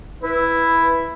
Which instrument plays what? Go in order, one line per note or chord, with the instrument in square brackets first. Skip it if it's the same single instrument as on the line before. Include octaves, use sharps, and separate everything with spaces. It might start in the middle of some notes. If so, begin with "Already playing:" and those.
[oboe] E4 [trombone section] B4